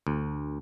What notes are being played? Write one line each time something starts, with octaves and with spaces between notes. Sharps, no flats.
D2